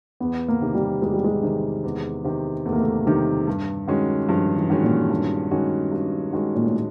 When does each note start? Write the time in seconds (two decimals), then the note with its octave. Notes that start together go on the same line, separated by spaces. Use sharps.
0.20 E2 B3
0.48 A#3
0.62 C3 D#3
0.74 G3
1.02 E2 G#3
1.13 G3
1.24 G#3
1.43 C3 D#3
1.84 E2
2.24 C3 D#3
2.65 E2 A3
2.73 A#3
2.81 A3
3.06 C3 D#3 G3
3.47 G2
3.88 D#3 G#3 C#4 F#4
4.29 G2 F3
4.56 E3
4.70 D#3 G#3 C#4 F#4
4.83 A#2
5.10 G2
5.51 D#3 G#3 C#4 F#4
5.92 G2
6.33 D#3 G#3 C#4 F#4
6.56 A#2
6.64 A2